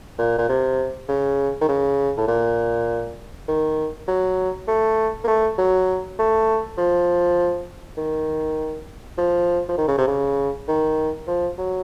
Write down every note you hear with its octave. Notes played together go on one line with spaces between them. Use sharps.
A#2
A#2
C3
C#3
D#3
C#3
A2
A#2
D#3
F#3
A3
A#3
A3
F#3
A3
F3
D#3
F3
F3
D#3
C#3
C3
C#3
D#3
F3
F#3